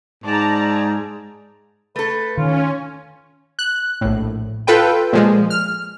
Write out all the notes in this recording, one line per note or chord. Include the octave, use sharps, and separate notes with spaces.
G#2 D5 A5 A#5
A3 A4 B4
D#3 C#4 F4
F#6
A#1 A2
F4 A4 B4 G5
A#2 F3 G#3
F6